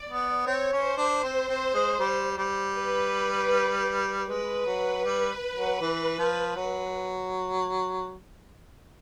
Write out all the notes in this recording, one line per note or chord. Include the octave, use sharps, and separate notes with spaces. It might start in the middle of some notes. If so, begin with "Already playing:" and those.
Already playing: D5
B3
C4 C#5
C#4
C5
D4
C4
C4
G#3
G3
G3
B4
G#3 B4
F#3
G3
F#3
E3
F3
F#3